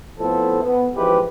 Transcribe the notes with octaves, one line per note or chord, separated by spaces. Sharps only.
F2 A2 B3 E4 A4 C5
B3
G#1 E3 F3 G#3 G4 B4